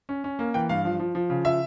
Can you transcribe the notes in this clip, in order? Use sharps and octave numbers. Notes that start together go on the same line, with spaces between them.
C#4
C#4
A#3
E3 G5
G2 F5
F3
F3
F3
C#3
F3 E5